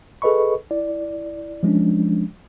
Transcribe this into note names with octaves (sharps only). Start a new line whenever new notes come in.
G#4 A4 B4 D#5 B5 C#6
E4 D5
F3 G#3 C#4 D4